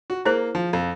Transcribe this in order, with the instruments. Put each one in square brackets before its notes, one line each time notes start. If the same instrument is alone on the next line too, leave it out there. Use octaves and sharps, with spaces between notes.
[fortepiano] F#4
[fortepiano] A#3 [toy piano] E4 G#4 C5
[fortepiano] F3
F2